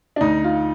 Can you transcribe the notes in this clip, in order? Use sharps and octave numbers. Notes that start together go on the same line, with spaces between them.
D4
D2 D#4
F4